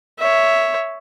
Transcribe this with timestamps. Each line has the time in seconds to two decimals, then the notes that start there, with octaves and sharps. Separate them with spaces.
0.19 C#5 E5